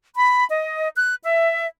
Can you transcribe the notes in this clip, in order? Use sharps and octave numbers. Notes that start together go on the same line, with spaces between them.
B5
D#5
F#6
E5